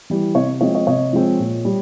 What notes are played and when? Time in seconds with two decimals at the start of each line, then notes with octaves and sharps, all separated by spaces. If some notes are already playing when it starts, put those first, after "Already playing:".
0.10 E3 G3
0.35 C3 C#5 D#5
0.61 F3 G#3 C4 C#5 D#5
0.74 C#5 D#5
0.87 C3 C#5 D#5
1.13 F3 G#3 C4
1.40 A#2
1.65 G3